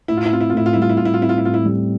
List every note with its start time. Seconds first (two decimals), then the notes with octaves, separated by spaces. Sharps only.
0.08 A2 E4
0.17 F4
0.25 E4
0.32 C4 F4
0.41 E4
0.50 F4
0.53 A2 E4
0.66 F4
0.73 E4
0.77 G3
0.82 F4
0.89 E4
0.97 A2 F4
1.05 E4
1.14 F4
1.20 C4 E4
1.29 F4
1.38 E4
1.43 A2 F4
1.54 E4
1.65 G3